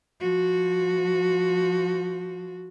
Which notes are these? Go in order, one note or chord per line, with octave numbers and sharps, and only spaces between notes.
F3 F#4